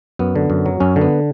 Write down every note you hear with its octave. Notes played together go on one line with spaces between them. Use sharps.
F#2 B3
D3
F#2
F#3
F#2 C#4
D3
B3